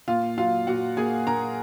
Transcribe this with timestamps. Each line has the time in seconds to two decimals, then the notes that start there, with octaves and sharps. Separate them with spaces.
0.08 A#2 F4 F5
0.38 F#3 F4 F5
0.67 A#2 F#4 F#5
0.97 A#3 G#4 G#5
1.27 A#2 A#4 A#5